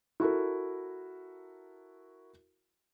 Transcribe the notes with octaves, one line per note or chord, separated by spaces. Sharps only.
E4 F#4 A4 A#4